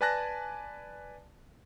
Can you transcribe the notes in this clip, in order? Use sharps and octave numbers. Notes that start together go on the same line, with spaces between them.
B4 D5 G#5 A5 F#6 A#6